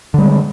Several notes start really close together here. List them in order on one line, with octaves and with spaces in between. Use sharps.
D3 G3 G#3